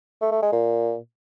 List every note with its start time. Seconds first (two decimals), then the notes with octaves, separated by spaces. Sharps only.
0.21 A3
0.32 A3
0.42 G#3
0.52 A#2